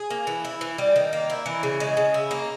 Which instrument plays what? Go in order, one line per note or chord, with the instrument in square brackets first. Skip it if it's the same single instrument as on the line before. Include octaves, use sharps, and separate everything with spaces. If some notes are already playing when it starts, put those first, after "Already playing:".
Already playing: [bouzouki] G#4
A#3
E3
E4
E3
G3
D#3
A#3
E4
E3
C#3
G#3
C#3
E4
A#3